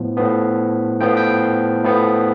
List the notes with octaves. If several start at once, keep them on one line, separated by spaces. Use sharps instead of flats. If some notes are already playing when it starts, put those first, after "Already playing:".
Already playing: A2 F3 B3
A2 F3 B3
A2 F3 B3 G5
G5
A2 F3 B3